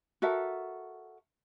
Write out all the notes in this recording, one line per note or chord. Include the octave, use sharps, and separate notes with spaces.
F#4 A4 A#4 E5